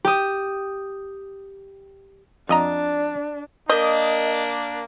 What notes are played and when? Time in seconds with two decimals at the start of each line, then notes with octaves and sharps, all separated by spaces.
0.05 G4 D#6
2.49 F2 D4 D#5 A#5
3.69 A#3 D4 A#4 D#5 D#6 G6